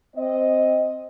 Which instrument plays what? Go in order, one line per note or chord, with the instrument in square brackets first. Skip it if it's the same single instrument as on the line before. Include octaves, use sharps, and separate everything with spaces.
[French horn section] C4 D#5